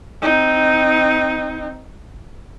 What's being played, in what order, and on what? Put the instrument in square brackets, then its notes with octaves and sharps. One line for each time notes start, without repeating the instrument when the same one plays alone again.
[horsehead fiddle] C4 D#4